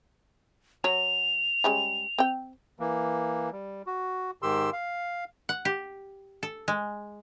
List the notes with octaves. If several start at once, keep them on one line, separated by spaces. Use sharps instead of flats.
F#3 F#4 C#5 F7
G3 G#3 C#4
C4 G5
E3 A#3
G3
F#4
G#2 D#3 G4 C6 E6
F5
F#5
G4
A4
G#3